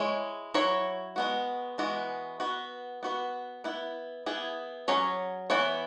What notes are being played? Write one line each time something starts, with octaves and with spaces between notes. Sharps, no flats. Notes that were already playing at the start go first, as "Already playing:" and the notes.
Already playing: G#3 E4 C#5
F#3 E4 C#5
G#3 B3 F#4
E3 G#3 B3 F#4
B3 F#4 B4
B3 F#4 B4
B3 E4 B4
B3 E4 G#4
F#3 C#4 G#4 C#5
E3 B3 E4 C#5